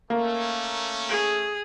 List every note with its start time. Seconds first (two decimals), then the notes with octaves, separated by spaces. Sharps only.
0.10 A3 A#3 C#4
1.09 G#4